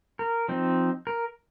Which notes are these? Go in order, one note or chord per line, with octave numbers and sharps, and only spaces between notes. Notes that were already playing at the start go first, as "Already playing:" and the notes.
A#4
F3 C4 D#4
A#4